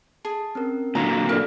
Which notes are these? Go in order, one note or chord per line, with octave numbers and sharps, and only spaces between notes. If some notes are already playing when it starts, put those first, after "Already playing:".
G#4 A5
C4 C#4 A#4
A#2 D3 F#3 F4 F5 A#5 B6
E4 A4 A#4 D5